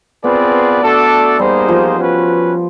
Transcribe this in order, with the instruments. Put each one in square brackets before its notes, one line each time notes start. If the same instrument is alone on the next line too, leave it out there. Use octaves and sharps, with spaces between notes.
[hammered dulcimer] B3 [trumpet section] C4 F4 G#4 B4 D5
[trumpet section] A3 D4 F#4 A4 D5
[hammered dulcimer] G3 [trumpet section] A#3 D#4 G#4 C5
[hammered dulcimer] F3
[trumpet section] C#4 F#4 B4